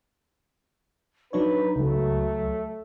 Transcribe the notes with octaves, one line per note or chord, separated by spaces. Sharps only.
F#3 D4 D#4 B4 C#5
C#2 F#3 A3